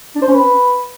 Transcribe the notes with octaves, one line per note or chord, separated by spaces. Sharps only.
D4
C5
C#4
B4